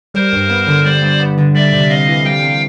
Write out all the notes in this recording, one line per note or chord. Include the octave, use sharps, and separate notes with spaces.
G3 A#4 C5
G2
B3
D3
G3 C5 D5
G2
B3
D3
G3 D5 E5
C3
C4 D#5 F5
E3
G3 F5 G5
C3